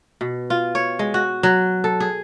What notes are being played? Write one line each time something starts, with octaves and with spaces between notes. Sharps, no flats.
B2
F4
C#5
G#3
F#4
F#3
A4
G#4